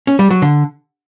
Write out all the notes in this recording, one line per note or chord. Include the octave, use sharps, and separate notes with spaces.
C#4
G3
F#3
D3